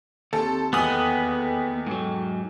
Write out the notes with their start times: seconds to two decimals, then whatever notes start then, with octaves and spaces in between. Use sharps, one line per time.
0.33 D#2 C4 G4 A4
0.73 E2 B3 A4 D#5 G5 D#6 F#7
1.87 G#2 F#3